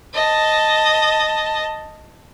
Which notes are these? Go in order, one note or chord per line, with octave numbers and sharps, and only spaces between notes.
D#5 A5